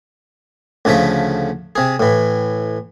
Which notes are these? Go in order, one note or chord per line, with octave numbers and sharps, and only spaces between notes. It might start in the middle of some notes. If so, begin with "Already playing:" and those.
D2 C#3 F3 A3 E5
C3 G#4
A2 E3